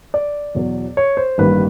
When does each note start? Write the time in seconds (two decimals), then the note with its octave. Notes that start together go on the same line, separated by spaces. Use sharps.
0.14 D5
0.55 E2 B2 F#3
0.97 C#5
1.17 C5
1.38 A1 G2 D#3 G3 A#3 B4